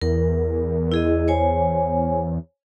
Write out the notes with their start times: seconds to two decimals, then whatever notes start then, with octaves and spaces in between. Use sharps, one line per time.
0.02 E2 A#4
0.92 E4 G#4 D#5
1.28 C5 C#5 G#5